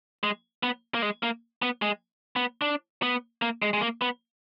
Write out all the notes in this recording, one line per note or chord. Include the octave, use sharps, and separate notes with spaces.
G#3
B3
A#3
G#3
A#3
B3
G#3
B3
D4
B3
A#3
G#3
G#3
A#3
B3